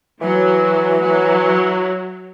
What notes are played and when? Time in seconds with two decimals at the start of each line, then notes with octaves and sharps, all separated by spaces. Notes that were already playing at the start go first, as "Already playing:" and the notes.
0.21 E3 F#3
1.02 F#3